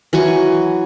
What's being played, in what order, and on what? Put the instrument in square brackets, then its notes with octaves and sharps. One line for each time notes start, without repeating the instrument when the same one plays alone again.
[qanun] E3 F#3 G#5 C#6